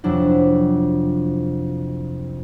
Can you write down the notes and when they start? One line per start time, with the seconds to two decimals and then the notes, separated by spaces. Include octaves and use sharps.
0.04 F2 C3 F#3 D4 E4